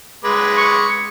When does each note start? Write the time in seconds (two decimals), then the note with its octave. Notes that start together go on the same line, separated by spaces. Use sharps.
0.24 G#3 B4 D6
0.57 C#6